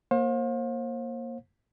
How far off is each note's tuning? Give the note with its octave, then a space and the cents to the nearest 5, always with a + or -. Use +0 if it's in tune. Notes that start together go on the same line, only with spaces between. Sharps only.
A#3 +0 C5 +40 F5 +35